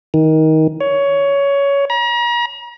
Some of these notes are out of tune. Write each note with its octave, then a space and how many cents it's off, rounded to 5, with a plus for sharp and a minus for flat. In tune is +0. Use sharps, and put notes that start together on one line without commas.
D#3 +20
C#5 +15
A#5 +40